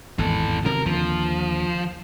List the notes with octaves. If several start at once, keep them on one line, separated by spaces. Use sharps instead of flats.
G#1 E2 E3 A4
C3 D#3 F#3 A#4
D#2 D3 F3